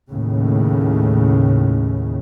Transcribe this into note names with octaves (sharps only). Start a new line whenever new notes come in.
D#2 A2 C#3